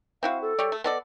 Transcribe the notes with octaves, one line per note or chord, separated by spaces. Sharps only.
C4 E4 F#4 F5
A4
G3 C#5 D5
A3
B3 A4 D5 D#5